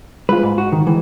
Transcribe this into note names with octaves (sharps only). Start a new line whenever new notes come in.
G#3 F4 B4
G#2
F#4
D#3
E3 G#3